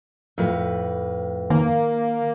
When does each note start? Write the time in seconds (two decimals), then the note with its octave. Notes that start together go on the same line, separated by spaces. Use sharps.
0.38 F2 A2 B4
1.50 D#3 A#3